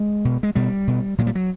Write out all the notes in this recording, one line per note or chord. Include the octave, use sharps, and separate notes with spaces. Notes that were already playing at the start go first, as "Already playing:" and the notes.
Already playing: G#3
B2
G#3
B2 G3
B2
A#2 F#3
G3
F#3